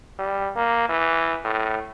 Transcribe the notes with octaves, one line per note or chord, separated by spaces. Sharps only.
G3
A#3
E3
A2